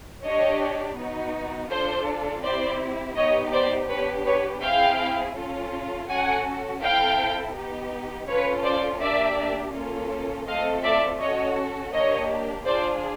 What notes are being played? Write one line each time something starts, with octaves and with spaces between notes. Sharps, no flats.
D4 G4 C#5 D#5
B3 D#4 F#4
D4 F4 A4 C5
C4 E4 G4 C5 D5
B3 D#4 G4 C#5 D#5
C5 D5
B3 D4 G4 B4 C#5
B4 C#5
C4 E4 G#4 F5 G5
C#4 F4 A4
C#4 F#4 A4 F#5 G#5
C4 E4 A4 F5 G5
B3 D#4 G4
C#4 F4 A4 B4 C#5
C5 D5
A#3 D4 G4 D5 E5
A#3 C#4 F4 A4
A3 C4 F4 A4 D#5 F5
D5 E5
C#4 F#4 A4 C#5 D#5
A#3 D4 G4 C#5 D#5
D4 F4 G#4 C5 D5